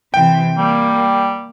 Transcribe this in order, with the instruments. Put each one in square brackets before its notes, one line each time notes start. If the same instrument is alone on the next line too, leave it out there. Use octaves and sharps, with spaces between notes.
[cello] C3 E3 [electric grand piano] G5
[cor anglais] G3 [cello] A#3